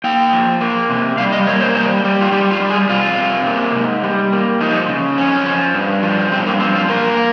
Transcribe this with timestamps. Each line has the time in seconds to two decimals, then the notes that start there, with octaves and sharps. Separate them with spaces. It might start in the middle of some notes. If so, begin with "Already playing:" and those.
0.04 A#3 G5
0.33 F3
0.61 A#3
0.89 C3
1.18 G3 F5
1.32 D#5
1.47 A#3 C#5
1.61 C5
1.75 G3 C5
2.04 G3
2.21 F4
2.32 G3 G4
2.51 F4
2.60 G3
2.70 G#4
2.89 C3 F4
3.18 C3
3.46 A#3
3.75 G#2
4.03 G3
4.33 A#3
4.60 F3 D#4
4.89 C#3
5.18 F2 C#4
5.46 F3
5.74 G2
6.03 F3
6.32 G2 C4
6.46 A#3
6.60 F3 C4
6.75 F4
6.89 A#3 A#4
7.17 A#3